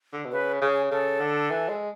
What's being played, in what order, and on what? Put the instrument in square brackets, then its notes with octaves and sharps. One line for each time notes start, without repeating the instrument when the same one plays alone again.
[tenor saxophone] D3
B2
[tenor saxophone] C#3 [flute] B4
[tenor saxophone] C#3 [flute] G#4
[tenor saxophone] C#3 [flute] A4
[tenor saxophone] D3
E3
G#3